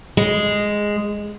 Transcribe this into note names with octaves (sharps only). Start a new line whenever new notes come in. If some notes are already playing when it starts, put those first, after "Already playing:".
G#3